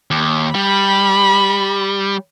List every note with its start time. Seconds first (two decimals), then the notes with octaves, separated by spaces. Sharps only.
0.11 D#2
0.55 G3 B5